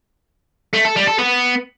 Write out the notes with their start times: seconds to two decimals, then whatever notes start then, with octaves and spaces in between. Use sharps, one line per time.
0.73 A3
0.85 A4
0.96 G3
1.07 A4
1.18 B3